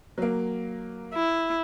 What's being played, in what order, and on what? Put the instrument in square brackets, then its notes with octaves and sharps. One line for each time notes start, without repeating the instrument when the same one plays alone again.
[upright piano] F#3 A#3
[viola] E4